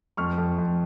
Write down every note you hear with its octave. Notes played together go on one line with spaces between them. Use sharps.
F2 C#6 F6
F2
F2